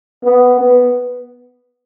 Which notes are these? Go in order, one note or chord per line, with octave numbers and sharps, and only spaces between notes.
B3
B3